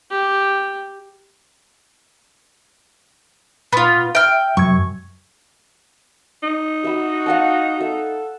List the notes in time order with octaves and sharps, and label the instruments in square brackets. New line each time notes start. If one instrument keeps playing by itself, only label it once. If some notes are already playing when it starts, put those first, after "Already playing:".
[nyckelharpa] G4
[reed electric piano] A#2 C6 [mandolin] B3 F4
[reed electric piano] E5 [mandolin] G5 F6
[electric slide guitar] F#2 [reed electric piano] C3 G#6 [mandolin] C#6
[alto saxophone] D#4
[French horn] F#4 [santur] E5 B5
[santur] F5 F#5 A5
[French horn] A4 [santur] E5